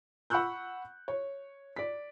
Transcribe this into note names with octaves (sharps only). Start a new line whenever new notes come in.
F#5 B5 C#6 E6 F#6 G6
C#5
D5 B6